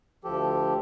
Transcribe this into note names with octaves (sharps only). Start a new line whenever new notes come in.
D2 F3 G4 A4